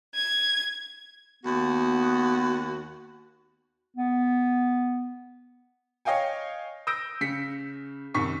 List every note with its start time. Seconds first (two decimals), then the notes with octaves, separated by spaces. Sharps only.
0.15 G#6
1.44 D#2 B3 F#4
3.97 B3
6.05 C#5 D#5 F5 G5 G#5
6.87 D#6 E6 G6 A#6 D7
7.21 C#3 B6 C#7
8.14 C2 F#2 D#3 C#6 B6